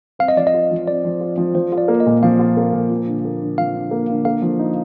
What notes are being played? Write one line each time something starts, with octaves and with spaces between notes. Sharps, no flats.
C4 F5
D#5
F3 D5
D#5
F4
F3
C4 D5
F3
F4
F3
F3 C5
F4
D5
A#3
D#5
A#2
F3 F5
F4
A#3
A#2
F3
D3
A#3
D3
F3 F5
D3
A#3
D3
A#3 F5
F3
D#4